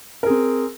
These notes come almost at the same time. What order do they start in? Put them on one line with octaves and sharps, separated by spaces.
A#4 G#4 C4